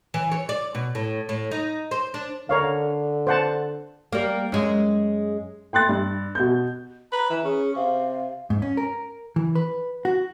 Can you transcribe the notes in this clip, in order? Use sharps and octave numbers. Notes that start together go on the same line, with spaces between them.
E3
C#5
D5
B2
A2
A2
D#4
C5
D4
D3 A#4 C#5 F5
C5 F#5 A5
G3 A#3
F#2 G#3
G5 C6 F#6 A6
G2
B2 G6
B4 A#5
E3
C#4 G#4
C3 F5
G#2
C#4
A#4
E3
B4
F#4